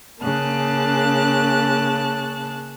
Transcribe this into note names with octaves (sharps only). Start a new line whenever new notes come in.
C#3 A#3 A5 F#6